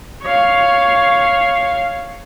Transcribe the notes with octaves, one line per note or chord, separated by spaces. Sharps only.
C#5 F5